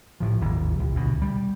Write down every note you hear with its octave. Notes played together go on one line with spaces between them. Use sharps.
A2 F3
G#1 D#2 A#2
C2
D2 B2
G3